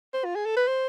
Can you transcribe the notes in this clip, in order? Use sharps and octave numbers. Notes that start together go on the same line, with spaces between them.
C5
F4
G#4
A4
B4
C5